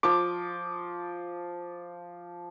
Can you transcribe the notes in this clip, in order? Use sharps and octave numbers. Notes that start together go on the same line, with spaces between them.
F3 D6